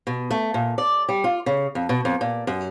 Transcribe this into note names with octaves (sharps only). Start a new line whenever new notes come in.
B2
A3
A#2
D5
G3
F4
C#3
F2
B2
F2
A#2
F#2